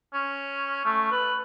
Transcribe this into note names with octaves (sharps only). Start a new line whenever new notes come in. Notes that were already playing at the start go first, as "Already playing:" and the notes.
C#4
A3
B4